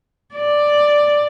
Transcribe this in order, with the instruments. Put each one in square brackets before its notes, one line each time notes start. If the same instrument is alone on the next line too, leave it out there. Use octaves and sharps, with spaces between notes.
[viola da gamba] D5